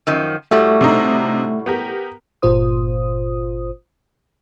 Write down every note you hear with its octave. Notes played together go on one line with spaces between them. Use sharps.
F#2 D#3 F3
A2 G3 A3 F#4
C3 D4 D#4
B3 G4 A#4
G1 A#2 F4 C5 D#6